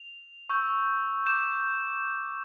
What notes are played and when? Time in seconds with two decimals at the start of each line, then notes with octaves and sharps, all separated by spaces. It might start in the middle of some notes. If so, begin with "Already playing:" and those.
Already playing: F7
0.49 C#6 E6 G6
1.26 D6 G6 E7